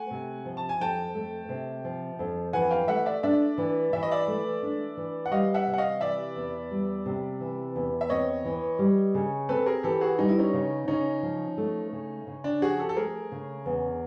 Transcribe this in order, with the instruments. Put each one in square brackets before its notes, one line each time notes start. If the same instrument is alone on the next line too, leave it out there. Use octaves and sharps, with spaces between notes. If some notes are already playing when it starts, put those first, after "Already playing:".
Already playing: [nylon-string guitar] A3 [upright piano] F#5 G#5
[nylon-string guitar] C3
F3
[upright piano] A5
G#5
[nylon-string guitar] F2 [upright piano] G5 A5
[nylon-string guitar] A3
C3
F3
F2
[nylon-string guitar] E3 [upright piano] F#5 G#5
[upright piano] F5 G5
[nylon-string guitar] A3 [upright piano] E5 F#5
[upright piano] D5 E5
[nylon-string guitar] D4 [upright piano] D5 E5
[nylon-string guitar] E3
[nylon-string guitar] E3 [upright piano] E5
[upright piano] D#5
D5 E5
[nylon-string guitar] A3
D4
E3
[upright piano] F#5
[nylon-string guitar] G3 [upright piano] D#5 F5
[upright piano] E5 F#5
[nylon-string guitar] C3
[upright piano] F#5
D#5 F5
[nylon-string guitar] E3 [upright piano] D5 E5
[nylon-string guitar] E2
G3
C3
E3
E2
[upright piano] E5
[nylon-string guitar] C4 [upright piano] C#5 D#5
[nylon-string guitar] E3
G3
C#3
[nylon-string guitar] C4 [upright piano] A4 B4
[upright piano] G#4 A#4
[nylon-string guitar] E3 [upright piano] G4 A4
[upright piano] F#4 G#4
[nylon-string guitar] G3 [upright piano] D#4
[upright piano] E4
C#4 D#4
[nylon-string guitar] C#3
[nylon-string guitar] C#3 [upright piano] C#4 D#4
[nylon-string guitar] F3
A3
C#3
C#3
[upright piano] D4
[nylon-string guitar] F3 [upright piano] F#4 G#4
[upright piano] G4 A4
A4
[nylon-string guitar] A3 [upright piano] G#4 A#4
[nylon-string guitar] C#3
E2